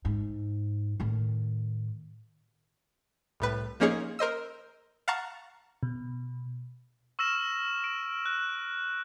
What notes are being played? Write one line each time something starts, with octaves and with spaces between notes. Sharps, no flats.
G#2
A2 D#3
C2 A2 B4
F3 A#3 C#4 D#4 G#4 C#5
A#4 C5 D#5 E6
F5 F#5 A5 A#5 C#6
B2
C#6 E6 F6 A#6 E7
D7
F#6